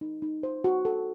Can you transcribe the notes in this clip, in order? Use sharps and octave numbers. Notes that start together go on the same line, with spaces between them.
D#4
D#4
C5
F#4
A4